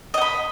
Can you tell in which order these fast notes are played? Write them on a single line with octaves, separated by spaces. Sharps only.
D#5 F#5 B5